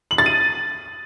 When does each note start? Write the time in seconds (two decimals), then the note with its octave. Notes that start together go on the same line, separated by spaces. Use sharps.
0.11 F#7
0.18 A6
0.26 D#7